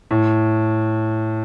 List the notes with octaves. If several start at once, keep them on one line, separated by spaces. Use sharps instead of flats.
A2